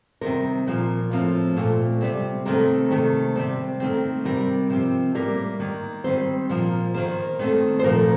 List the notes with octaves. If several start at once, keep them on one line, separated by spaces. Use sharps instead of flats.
C3 D#3 G3 C4 A#4
A#2 F3 A#3
A2 F3 C4
A#2 A3 C4
C3 G3 C4
C3 D#3 A3 C4 A#4
C3 D#3 A3
C3 G3 C4
D#3 A3 C4
C3 G3 C4 A#4
C3 F3 C4
A2 G3 A#3 A#4
D#3 A#3
D#3 G3 C4 C5
A#2 F3 A#3
D#3 A#3 C5
D#3 A3 C4
C5
A#2 F3 A3 A#4